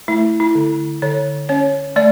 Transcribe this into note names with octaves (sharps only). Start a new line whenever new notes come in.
A3 E4
E4
D3
D3 C#5
C#4 C#5
A3 D5